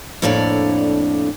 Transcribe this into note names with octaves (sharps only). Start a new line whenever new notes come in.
F2 A2 A#3 D4 C#5 D5